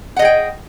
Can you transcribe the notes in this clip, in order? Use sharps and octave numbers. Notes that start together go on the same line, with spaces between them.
G#4 D#5 F#5 G5